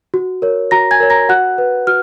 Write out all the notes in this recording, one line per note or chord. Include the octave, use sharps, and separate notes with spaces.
F#4
A#4 C#5
F#4 A#5 A#6
G#5 G#6
A#4 C#5
A#5 A#6
F#4 F#5 F#6
B4
F#4 F6